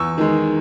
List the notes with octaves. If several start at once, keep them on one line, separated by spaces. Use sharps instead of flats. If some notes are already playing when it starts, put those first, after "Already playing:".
Already playing: E2 C#6 E6
D#3 G#3